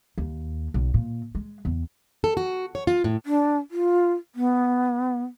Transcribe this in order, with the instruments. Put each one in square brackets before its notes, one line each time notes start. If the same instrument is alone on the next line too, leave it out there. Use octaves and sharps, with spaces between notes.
[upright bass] D#2
B1
A#2
G#3
E2
[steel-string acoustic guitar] A4
F#4
C#5
F4
A2
[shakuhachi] D4
F4
B3